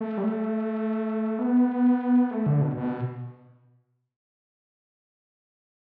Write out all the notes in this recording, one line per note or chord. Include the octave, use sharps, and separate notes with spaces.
A3
G3
A3
B3
A3
D3
B2
B2